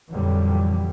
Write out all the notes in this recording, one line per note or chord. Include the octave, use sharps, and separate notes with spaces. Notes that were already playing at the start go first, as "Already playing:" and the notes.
F2 A#2 D3 E3 F#3 G3